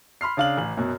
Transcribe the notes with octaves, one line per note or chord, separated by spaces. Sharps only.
B5 C6 F6 C7
C#3 D4 F5 F6 F#7
A1 F#7
F#2 B2